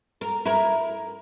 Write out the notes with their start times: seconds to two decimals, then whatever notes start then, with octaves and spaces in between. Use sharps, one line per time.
0.21 A#4
0.45 E4 A#4